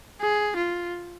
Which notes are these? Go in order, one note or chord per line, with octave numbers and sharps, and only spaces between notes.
G#4
F4